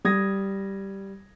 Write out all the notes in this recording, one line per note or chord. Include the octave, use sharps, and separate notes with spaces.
G3 D#6 G#6 A#6